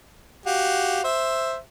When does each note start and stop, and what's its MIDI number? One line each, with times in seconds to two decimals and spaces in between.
0.46 1.04 66
0.46 1.04 67
0.46 1.04 77
1.04 1.58 72
1.04 1.58 76